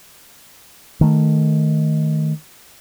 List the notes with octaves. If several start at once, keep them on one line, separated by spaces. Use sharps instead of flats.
D#3 A3